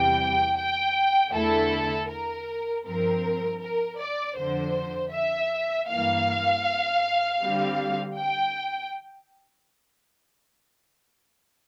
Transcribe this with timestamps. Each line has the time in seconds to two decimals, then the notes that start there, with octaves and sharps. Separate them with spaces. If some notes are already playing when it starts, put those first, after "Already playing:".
Already playing: E2 C3 E3 G3 G5
0.57 G5
1.33 E2 D3 A3 E4 A4
2.09 A#4
2.85 G2 F3 C4 A#4
3.61 A#4
3.99 D5
4.37 F2 D3 F3 C5
5.12 E5
5.89 G2 E3 A#3 F5
7.41 D3 G3 C4
8.17 G5